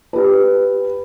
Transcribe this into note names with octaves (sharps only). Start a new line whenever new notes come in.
G4 B4